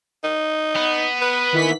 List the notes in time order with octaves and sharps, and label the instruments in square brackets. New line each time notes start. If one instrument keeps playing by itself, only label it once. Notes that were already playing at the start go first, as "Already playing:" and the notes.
[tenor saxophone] D#4
[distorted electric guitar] B3
[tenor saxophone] B4
[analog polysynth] D#3 E3 B6